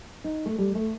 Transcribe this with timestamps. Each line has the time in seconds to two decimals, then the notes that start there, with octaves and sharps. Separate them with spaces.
0.24 D#4
0.46 A3
0.58 G3
0.75 A3